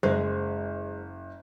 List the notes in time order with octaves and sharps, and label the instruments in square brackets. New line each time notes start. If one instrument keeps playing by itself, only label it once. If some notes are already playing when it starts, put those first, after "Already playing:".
[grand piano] F#1 [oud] G#3 [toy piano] C5